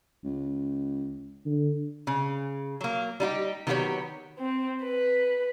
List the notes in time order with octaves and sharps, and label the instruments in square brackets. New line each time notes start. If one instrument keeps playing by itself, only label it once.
[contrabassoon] C#2
[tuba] D3
[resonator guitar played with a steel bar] C#3
F#3 A#3
G3 D#4 F4 G4
D#3 F#3 B3 F4 G4 C#5
[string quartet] C4
B4